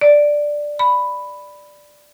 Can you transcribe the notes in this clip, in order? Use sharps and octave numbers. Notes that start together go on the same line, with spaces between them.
D5
B5